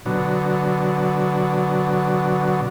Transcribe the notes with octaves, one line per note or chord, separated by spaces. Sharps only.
B2 D3 F#3